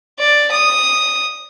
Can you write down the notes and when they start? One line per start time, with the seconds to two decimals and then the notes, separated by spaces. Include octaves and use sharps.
0.19 D5
0.51 D#6